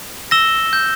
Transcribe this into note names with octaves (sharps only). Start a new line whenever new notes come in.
E6 A#6 E7 G7
G6